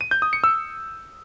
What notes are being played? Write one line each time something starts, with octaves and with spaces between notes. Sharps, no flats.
D#7
G6
D#6
C#7
E6